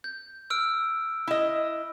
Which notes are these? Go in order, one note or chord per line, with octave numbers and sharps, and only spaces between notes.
G6
E6 F6 D7
E4 D#5